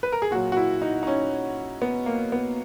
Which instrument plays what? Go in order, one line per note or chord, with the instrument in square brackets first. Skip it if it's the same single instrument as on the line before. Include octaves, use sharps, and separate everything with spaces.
[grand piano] B4
A#4
G#4
A#2 F#3 F#4
F#4
E4
D#4
D#4
C#4
B3
A#3
B3